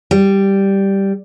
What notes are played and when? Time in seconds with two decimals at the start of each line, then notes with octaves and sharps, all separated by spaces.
0.11 G3